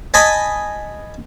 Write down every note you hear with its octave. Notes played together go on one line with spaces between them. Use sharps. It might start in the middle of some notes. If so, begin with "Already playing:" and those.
D#5 G#5 A5 B5